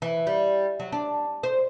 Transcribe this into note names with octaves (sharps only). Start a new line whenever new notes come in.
E3
G3
F#3
D4
C5